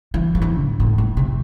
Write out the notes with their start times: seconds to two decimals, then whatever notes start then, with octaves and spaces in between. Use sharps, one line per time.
0.14 E3
0.35 F3
0.42 E3
0.61 A2
0.80 A2
0.98 A2
1.17 C3